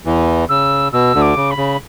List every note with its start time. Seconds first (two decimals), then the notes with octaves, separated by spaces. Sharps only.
0.05 E2 E3
0.49 C#3 E6
0.92 B2 E6
1.15 D2 D3
1.22 D6
1.36 C#3
1.51 B5
1.57 C#3